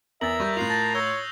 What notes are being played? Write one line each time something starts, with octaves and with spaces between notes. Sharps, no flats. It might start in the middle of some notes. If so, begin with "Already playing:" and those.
E2 A#4 E5 D#6 A6 F#7
G3 C#6 G6
A2 F4 F#6 C7 F7
A5 A6 A#6
C#5 E6 G6 G7